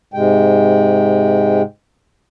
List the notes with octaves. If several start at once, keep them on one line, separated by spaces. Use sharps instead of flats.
G#2 C3 G#3 G5